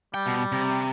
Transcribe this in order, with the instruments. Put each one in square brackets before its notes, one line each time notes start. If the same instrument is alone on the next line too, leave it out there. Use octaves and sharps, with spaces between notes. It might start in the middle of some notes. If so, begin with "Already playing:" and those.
[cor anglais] G3 [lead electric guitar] G5
[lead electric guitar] B2
C3